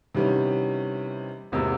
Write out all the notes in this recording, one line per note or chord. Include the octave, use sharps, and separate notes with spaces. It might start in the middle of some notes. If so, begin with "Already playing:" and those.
C3 D#3 E3 G3 B3 C#4
G#1 E2 C3 A#3 C4 E6